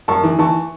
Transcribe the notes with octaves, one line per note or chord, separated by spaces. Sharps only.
F#2 A5 C#6
E3
E3 A5 C#6